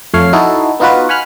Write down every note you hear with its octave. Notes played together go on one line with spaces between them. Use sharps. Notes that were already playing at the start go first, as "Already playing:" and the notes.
F2 A3 C#5 F5 C7
D#4 E4 F#4 A4
B3 D#4 F4 F#4 B4
F#5 G#5 B5 F6 F#6